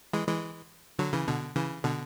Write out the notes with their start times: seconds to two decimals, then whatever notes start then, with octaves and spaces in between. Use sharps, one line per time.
0.13 E3 G#3
0.28 E3 G#3
0.99 D3 F#3
1.13 C#3 E3
1.28 B2 D3
1.56 C#3 E3
1.84 B2 D3